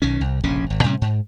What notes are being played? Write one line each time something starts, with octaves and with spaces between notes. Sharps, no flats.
B1 D#3 C#4
C2
F1 A#1 C#3 C#4
G#1
A2 C3 G3 C#4
G#2